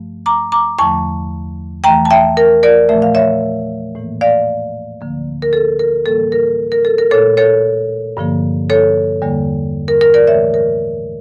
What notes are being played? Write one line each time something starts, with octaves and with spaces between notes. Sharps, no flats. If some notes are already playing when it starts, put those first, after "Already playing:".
Already playing: G2 F3 A3
A#5 D6
A#5 D6
E2 D3 F3 A3 A5 C#6
E2 E3 A3 G5 A#5
A5
E5 G5
A#4
A#4 D5
A#2 F3 A3 E5
F5
C#5 E5
A2 E3 A#3
D5 F5
D2 D3 F3 A#3
A#4
A4
A#4
A2 E3 G3 A#3 A4
A#4
A#4
A4
A#4
A#2 A3 A4 C#5
A4 C#5
G2 D3 F3 A#3
A4 C#5
E2 D3 G3 A#3
A#4
A#4
A#4 D5
A2 E3 A3 C#5 E5
A#4